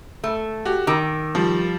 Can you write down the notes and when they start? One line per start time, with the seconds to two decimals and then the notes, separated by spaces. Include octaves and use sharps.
0.24 A3
0.65 F#4 G4
0.87 D#3 D6 E6
1.35 F3 G3